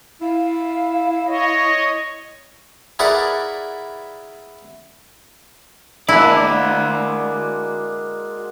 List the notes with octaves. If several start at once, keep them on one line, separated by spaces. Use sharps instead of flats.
E4 F5
C#5 D#5
E4 G#4 A#4 B4 D5 F#5
G#3 A#3 D4 E4 F#4 D5